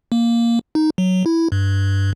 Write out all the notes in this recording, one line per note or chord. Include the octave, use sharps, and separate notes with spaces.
A#3
D#4
F#3
E4
G2